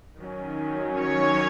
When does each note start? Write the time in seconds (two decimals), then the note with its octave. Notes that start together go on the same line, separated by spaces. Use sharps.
0.19 D#3 F#3 C#4
0.99 C#5